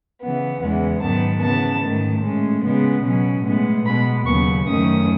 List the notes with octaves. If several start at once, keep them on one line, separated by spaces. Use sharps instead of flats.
C#3 E3 B3
E2 C#3 E3 G#3 B3
G#2 D#3 F#3 B3 A5
C#3 E3 B3 A5
G#2 D#3 A3
A2 G#3 C#4
C#3 G#3 B3
B2 F#3 C#4
A2 G#3 B3
B2 G#3 B3 B5
D#2 C#3 F#3 B3 C#6
F#2 D#3 A3 C#4 D#6